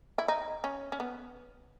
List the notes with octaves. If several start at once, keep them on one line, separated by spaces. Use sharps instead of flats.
E4
D#4
C#4
C#4
B3